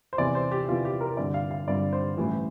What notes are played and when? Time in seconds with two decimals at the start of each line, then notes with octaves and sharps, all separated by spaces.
0.13 C5
0.18 E2 C3 E3 D5
0.35 C5
0.52 G4
0.68 E2 C3 E3 F4
0.85 G4
1.01 A#4
1.17 G2 D3 G3 C4 D5
1.34 F5
1.51 F5
1.67 G2 D3 G3 C4 D5
1.93 C5
2.17 A1 A2 E3 G3